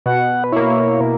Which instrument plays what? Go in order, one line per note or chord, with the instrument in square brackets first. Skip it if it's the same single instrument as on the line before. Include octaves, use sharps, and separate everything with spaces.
[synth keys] B2 [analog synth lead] F#5
[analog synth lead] B4
[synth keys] A#3 E4 [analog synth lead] C#5
[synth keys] B2 [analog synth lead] A#4